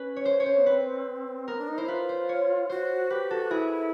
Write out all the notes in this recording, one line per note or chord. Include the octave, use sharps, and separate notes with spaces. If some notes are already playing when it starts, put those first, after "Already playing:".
Already playing: C#4 B4
C#5
C5
C#5
C5
B3
C4 B4
B3 A#4
D4
D#4
E4 C5
F4 B4
C5
C#5
F#4 C5
G4 B4
F#4 A4
E4 G#4